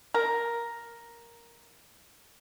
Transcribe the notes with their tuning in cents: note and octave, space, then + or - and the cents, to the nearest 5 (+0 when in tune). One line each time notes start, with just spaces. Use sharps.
A#4 +5